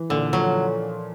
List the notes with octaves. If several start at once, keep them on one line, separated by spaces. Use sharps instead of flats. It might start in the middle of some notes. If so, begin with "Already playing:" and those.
Already playing: E3
A#2 D3
F3 F#3